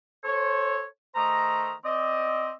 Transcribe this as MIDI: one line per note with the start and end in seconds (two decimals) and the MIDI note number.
0.24 0.84 69
0.24 0.84 72
0.24 0.84 73
1.15 1.72 51
1.15 1.72 57
1.15 1.72 72
1.15 1.72 75
1.15 1.72 82
1.84 2.50 60
1.84 2.50 74
1.84 2.50 75